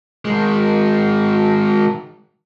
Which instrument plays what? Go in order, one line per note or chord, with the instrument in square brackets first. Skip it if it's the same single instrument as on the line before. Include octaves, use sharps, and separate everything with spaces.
[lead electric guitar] D#3 G#3